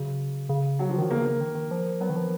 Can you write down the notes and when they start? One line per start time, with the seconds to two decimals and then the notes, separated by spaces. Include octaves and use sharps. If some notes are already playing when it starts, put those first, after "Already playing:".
Already playing: C#3 F#3
0.49 C#3
0.79 F#3
0.89 F3
0.98 D#3 F#3
1.10 C#3 A#3
1.25 A#3
1.41 D#3
1.55 D#3
1.71 F3
2.01 F#3 B3
2.09 D#3
2.16 F3